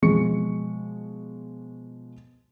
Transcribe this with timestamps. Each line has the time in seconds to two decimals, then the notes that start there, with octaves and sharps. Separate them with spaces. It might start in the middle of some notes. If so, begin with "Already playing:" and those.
0.02 B2 F3 G#3 C#6 C#7